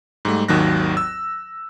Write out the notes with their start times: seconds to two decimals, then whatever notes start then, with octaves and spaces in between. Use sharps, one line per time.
0.25 G#2 G3 A3
0.48 G#1 D#2 D#3 F#3 F#6 A#6
0.97 E6